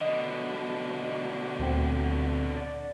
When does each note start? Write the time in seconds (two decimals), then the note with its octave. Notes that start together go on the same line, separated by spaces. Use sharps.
0.01 B2 D3 D#5
1.59 D2 A#2 C4
2.57 D5